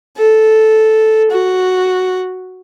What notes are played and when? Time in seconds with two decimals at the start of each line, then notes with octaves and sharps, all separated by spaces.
0.18 A4
1.31 F#4